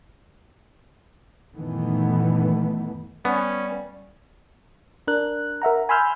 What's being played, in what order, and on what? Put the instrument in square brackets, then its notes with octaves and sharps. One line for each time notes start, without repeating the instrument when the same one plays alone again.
[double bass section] F#2 A#2 D#3 E3 A3 B3
[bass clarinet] G3 [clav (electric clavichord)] B3 [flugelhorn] C#4
[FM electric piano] D4 A#4 F#6
A#4 E5 F#5 A#5
G#5 B5 C6 E6 F6 G6